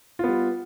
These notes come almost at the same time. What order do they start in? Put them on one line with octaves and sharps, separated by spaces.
F4 B3 G3